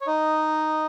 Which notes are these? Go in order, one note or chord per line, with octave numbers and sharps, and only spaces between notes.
C#5
D#4 D#5